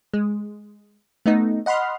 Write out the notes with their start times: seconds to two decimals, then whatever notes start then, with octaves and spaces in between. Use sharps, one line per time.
0.14 G#3
1.26 A3 B3 D#4
1.66 D#5 F#5 B5 C6 F6